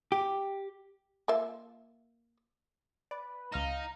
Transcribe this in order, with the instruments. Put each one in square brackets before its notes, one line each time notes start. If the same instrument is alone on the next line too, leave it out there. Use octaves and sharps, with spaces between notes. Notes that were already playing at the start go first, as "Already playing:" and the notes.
[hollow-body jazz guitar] G4
[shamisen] A#3 F4 E5
[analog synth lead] B4 [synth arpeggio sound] D5
[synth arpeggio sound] C#2 F6 E7 [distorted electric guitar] D#4 [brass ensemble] F5 [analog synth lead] A#5